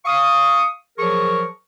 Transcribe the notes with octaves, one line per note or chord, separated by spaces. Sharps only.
F5 C#6 D#6
F3 F#3 G#4 A#4 C#6